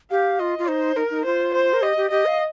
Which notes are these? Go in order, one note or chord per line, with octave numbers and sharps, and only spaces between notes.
G4 F5
F4 D#5
F4
D#4 C5
D#4 A#4
D#4
F4 C5
C5
A#4
G4 D#5
G4
G4 D#5
F5